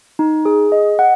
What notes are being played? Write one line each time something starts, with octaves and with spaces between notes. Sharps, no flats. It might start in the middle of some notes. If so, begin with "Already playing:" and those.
D#4
G#4
D#5
F#5